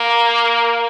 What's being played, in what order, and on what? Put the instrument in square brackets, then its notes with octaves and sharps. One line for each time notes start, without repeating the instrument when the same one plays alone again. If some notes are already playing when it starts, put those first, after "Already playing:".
Already playing: [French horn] A#3